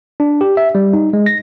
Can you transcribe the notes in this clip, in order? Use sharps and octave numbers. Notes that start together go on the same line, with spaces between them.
D4
G4
E5
G3
D#4
G#3
A#6